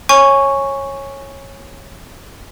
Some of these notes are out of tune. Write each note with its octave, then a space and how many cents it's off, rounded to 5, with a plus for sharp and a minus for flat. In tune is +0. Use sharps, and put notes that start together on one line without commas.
C#5 -15 G#5 +0 C#6 +0